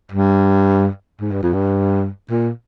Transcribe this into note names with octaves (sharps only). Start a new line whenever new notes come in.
G2
G#2
G2
F2
G2
A#2